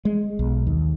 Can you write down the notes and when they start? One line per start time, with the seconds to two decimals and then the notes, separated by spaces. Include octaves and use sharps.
0.05 G#3
0.39 B1
0.67 D#2